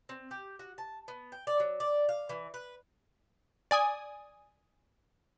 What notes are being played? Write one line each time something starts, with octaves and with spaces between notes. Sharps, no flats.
C4
G4
F#4
A5
B3
G5
D5
F#3
D5
F5
E3
B4
D5 G#5 D#6